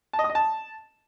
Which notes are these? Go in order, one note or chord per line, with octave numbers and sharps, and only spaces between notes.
A5
D#5
D#6
D#5
A5